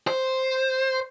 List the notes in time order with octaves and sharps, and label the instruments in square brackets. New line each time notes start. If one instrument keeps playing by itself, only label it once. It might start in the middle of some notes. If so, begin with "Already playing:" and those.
[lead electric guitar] C5